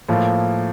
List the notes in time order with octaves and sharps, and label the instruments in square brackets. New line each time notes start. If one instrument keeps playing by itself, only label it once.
[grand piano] A2 F3 A#3